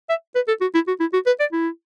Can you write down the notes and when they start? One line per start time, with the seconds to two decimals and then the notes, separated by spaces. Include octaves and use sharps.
0.09 E5
0.35 B4
0.48 A4
0.61 F#4
0.74 E4
0.88 F#4
1.00 E4
1.13 F#4
1.26 B4
1.40 D5
1.52 E4